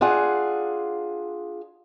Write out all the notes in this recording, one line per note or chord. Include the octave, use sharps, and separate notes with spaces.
D4 F4 G#4 F#5